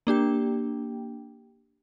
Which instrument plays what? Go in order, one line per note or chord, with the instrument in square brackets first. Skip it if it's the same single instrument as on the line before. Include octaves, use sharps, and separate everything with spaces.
[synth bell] A#3 D4 G4 G5